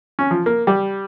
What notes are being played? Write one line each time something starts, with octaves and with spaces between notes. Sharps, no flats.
C#4
F3
A#3
G3